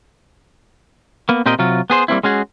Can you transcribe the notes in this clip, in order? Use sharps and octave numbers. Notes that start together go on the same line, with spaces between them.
A#3 B3
A#2 C4 G4 A#4 D#5
C3 F#3 F4
B3 G#4 C5
G3 A#3 C4 E4
G#3 C#4 F#4 G#4